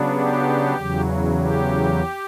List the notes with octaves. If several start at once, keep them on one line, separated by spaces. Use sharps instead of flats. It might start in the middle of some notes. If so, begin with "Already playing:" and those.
Already playing: C#3 F#3 B3 D4
G4
E2 C#3 F#3
G4